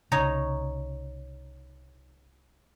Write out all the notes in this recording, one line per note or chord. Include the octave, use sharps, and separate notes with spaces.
C2 C#3 D#4 C#5 A#5